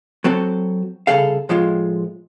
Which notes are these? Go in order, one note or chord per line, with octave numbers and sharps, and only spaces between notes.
F#3 C4 F#4 A4
C2 A#2 C#3 G#4 A4 F5
A2 F3 G#3 F4